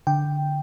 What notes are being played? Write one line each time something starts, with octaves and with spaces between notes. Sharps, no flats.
D3 G5